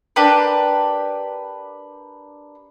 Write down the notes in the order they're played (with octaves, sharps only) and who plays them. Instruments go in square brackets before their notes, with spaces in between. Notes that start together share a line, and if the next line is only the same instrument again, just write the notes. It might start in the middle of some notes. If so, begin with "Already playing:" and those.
[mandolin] D4 G4 A#4 B4